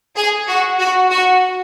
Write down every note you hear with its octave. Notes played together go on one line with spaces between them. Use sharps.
G#4
F#4
F#4
F#4